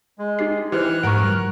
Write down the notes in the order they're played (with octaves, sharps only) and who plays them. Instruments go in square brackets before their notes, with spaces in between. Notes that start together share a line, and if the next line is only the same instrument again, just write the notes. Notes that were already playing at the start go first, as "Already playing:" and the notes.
[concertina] G#3
[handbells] D#4 G4 C7
[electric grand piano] E3 [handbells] G4 C5 [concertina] F6 F#6
[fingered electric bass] G#2 F3 [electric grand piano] A#4 F#5 [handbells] C#6 D7
[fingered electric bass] F#3 G3